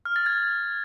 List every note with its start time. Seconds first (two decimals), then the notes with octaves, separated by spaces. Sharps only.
0.05 F6
0.16 A6
0.26 G#6